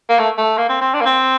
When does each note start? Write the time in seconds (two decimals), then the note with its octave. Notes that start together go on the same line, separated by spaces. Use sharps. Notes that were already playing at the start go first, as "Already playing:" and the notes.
0.09 A#3
0.19 A3
0.38 A3
0.57 A#3
0.69 C4
0.81 C4
0.94 D4
1.01 A#3
1.06 C4